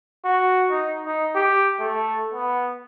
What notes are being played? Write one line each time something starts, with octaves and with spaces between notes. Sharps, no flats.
F#4
D#4
D#4
G4
A3
B3